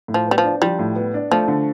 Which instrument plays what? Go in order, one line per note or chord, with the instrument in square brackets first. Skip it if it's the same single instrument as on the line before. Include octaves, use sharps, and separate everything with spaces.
[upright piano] A2
[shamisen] F3
[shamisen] G3 [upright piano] B3
[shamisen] F3
[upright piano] D4
[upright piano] F3 [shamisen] G3
[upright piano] A2
B3
D4
[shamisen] F3 [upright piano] A3
[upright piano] D3